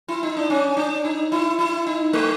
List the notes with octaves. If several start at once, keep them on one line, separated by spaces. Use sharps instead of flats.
E4
D#4
D4
C#4
D4
D#4
E4
E4
D#4
A3